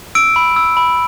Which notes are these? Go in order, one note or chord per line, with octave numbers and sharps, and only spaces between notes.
E6 D7
B5
E6
B5